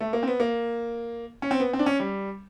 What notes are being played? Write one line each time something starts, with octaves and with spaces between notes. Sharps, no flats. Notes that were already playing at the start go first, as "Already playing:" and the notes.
A3
A#3
C4
B3
A#3
C#4
C4
B3
C4
D4
C#4
G3